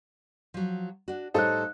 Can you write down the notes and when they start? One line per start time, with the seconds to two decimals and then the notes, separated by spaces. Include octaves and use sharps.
0.54 F3 F#3
1.08 D4 F#4
1.34 A2 G3 D#4 A4 C5 C#5 F5 F#6